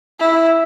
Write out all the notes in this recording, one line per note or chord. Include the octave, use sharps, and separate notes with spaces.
E4